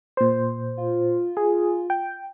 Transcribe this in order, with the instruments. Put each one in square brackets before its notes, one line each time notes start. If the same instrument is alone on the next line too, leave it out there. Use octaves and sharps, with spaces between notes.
[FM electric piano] A#2 C5
[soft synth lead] F4
[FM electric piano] G#4
G5